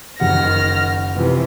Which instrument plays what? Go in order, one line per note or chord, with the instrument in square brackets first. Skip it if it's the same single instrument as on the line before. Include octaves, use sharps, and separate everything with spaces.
[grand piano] F#1 F#5 [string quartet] D#3 F6 A#6
[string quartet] C3 E3 F3